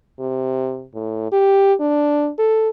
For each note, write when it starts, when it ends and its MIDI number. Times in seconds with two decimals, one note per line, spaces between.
0.19 0.86 48
0.95 1.32 45
1.32 1.74 67
1.80 2.30 62
2.39 2.69 69